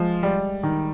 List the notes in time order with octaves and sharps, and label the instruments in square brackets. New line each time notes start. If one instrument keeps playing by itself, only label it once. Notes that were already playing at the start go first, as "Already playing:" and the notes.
Already playing: [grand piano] F3 [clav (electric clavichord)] G#3
[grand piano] G3
D#3